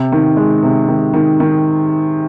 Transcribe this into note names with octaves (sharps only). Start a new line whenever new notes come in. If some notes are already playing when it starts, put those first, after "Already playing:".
Already playing: C3
D#3
G#3
C3
D#3
D#3
D#3